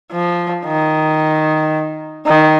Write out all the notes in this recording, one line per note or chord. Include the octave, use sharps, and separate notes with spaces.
F3
D#3
D#3